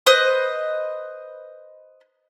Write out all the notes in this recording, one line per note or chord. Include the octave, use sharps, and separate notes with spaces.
B4 C5 D#5 D#6